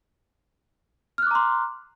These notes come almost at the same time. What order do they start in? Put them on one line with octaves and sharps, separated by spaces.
F6 F#6 D6 A#5 C6